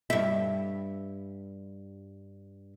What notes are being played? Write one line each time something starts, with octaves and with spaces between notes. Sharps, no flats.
G2 E5